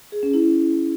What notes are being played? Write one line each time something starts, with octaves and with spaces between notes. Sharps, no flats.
G#4
C#4
E4